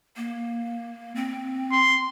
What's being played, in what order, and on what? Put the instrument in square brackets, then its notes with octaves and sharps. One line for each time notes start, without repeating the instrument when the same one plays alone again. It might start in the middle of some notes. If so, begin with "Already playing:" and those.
[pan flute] A#3
C4
[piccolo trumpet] C6